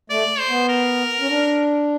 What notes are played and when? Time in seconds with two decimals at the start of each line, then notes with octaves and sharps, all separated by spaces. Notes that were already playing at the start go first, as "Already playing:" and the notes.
0.10 A3 D5
0.39 C5
0.49 B3
0.69 A#4
1.20 C#4
1.28 D4